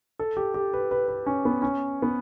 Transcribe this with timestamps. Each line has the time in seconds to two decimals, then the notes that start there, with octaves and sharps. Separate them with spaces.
0.19 A4
0.37 G4
0.54 G4
0.73 B4
0.91 B4
1.08 B4
1.26 C#4
1.45 B3
1.62 C#4
2.02 B3